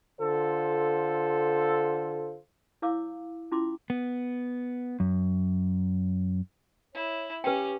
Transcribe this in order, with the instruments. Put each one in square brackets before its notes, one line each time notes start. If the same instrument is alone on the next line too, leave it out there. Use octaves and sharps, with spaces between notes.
[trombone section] D3 F4 A4 C5
[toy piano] E4 C#5 F5 D6 E6
C#4 E4 F4 C6 D6
[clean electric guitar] B3
F#2
[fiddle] E4 [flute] C#5
[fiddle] C#4 [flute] G4 [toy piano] B4 G5